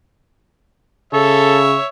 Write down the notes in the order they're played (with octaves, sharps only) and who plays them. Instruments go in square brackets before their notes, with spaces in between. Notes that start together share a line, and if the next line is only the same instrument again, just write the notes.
[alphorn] C#3 [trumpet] A4 [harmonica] C#5 E5